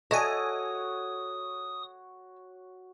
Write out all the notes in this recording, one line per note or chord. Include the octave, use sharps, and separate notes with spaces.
F#4 A4 C#5 D#5 E5 G#5 D6 D#6